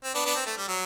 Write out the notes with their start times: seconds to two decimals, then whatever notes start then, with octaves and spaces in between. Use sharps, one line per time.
0.04 C4
0.15 B3 D4
0.25 B3 D4
0.36 C4
0.46 A3
0.57 G3
0.68 F#3